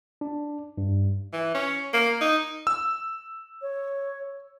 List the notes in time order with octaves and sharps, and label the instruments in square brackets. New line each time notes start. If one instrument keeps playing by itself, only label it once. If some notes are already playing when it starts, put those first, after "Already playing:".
[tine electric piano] D4
G2
[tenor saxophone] E3
C#4
A#3
D#4
[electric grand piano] E6
[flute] C#5